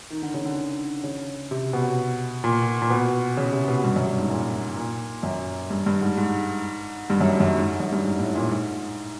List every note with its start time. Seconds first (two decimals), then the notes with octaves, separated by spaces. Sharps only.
0.10 D#3
0.22 D3
0.34 C#3
0.45 D3
1.04 C#3
1.51 C3
1.73 B2
2.44 A#2
2.82 A#2
2.90 B2
3.37 C#3
3.52 C3
3.68 B2
3.84 G2
3.96 F#2
4.07 G2
4.18 G#2
4.30 A#2
4.77 A#2
5.23 F#2
5.70 G2
5.86 G2
6.01 G#2
6.17 G#2
7.10 G2
7.21 F#2
7.40 F#2
7.58 G#2
7.80 F#2
7.92 G2
8.04 G#2
8.19 A2
8.35 A#2
8.50 G#2